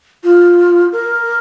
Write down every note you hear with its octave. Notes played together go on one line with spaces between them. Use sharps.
F4
A#4